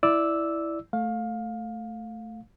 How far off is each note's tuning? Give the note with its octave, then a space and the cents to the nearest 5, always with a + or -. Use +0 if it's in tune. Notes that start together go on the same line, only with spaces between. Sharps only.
E4 +0 D5 +0 E6 -5
A3 +0 F5 +20